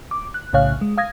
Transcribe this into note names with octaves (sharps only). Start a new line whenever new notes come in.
D6
F#6
B1 A2 C#3 C#5 F5 F#6
G#3
F5 D#6 G#6 A#6